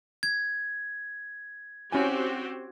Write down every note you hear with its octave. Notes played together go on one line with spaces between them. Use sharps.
G#6
C4 C#4 E4 F#4 G4 G#5